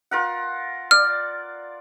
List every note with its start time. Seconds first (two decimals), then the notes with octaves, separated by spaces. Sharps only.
0.11 F4 A#4 F#5
0.91 D5 F6